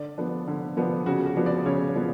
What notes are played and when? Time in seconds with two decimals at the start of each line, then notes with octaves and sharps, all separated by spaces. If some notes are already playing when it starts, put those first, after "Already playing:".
Already playing: D3 D5
0.18 F3 B3 D4
0.48 D3
0.77 F3 B3 D4
1.06 C#3 F#4
1.26 F#4
1.36 F3 B3 D4
1.46 D5
1.66 C#3 C#5
1.96 F3 B3 D4